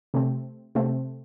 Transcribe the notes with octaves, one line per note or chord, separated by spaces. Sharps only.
C3 A3 C4
C3 A3 C4